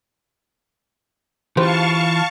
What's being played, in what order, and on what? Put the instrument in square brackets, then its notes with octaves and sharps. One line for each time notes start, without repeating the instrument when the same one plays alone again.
[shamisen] C#3 G4 C5 [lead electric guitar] E3 F4 [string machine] F5 A5 C#6